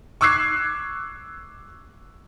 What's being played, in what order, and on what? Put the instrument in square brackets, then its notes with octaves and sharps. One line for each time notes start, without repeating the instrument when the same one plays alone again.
[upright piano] C#6 D6 E6 F#6 G#6 C7